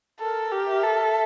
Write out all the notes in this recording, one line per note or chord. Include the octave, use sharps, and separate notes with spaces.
A4 A#4
G4
E5
A4